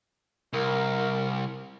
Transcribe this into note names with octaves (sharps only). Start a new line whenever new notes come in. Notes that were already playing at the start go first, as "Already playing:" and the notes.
C2 A#4